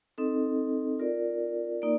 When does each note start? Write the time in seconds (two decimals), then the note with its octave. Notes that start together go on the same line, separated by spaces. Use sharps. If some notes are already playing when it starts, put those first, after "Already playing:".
0.18 C4 D#4 A4 D#5
0.99 F4 A#4 D5
1.82 A#3 D#4 A#4 D5